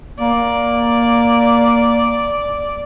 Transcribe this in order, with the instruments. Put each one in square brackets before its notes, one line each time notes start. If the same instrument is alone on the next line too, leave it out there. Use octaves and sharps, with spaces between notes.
[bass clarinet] A#3 [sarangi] D5